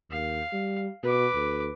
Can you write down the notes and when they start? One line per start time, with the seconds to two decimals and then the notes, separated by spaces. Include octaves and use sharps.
0.11 D#2 F5
0.53 G3
1.03 B2 B4 D6
1.34 D2